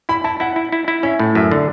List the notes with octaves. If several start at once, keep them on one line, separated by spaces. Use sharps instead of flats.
E4 B5
E4 A5
E4 F#5
E4
E4
E4
C#4 E5
A2
F#2 E5
D3